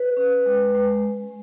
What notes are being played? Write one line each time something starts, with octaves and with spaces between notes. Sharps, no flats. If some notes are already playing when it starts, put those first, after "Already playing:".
Already playing: B4
C#4
G#3
G#3